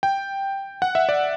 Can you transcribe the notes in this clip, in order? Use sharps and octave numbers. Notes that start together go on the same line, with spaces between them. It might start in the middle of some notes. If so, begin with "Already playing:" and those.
G5
F#5
E5
D5